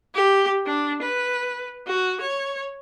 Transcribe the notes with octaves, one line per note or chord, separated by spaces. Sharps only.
G4
D4
B4
F#4
C#5